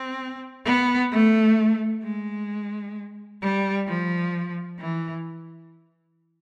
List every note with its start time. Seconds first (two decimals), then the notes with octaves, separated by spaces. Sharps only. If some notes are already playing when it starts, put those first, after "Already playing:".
Already playing: C4
0.66 B3
1.12 A3
2.03 G#3
3.42 G3
3.88 F3
4.79 E3